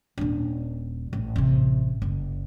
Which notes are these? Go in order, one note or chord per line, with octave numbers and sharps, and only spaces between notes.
D#1 D4
A1
A1 C3
F#1